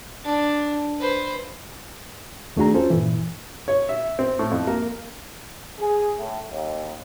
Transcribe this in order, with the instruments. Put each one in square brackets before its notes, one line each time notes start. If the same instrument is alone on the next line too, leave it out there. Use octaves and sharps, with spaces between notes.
[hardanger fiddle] D4
B4 C5
[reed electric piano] D#2 A3 D4 F#4 G#4 A#5
C#4 F4 A4 C5
G2 A#2 E3
[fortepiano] C#5
E5
C4
A2
F2
A#3
[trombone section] G#4
A2
D#2